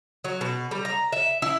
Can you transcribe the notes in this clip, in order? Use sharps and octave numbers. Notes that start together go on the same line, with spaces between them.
F#3
B2
G3
A#5
E5
E4